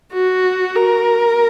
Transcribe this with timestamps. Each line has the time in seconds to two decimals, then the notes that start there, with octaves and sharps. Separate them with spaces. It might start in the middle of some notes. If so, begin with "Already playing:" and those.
0.13 F#4
0.76 A#4